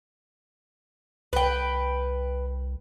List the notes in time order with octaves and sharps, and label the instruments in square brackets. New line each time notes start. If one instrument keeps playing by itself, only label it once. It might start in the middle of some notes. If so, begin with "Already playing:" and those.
[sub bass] C2 [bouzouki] B4 G5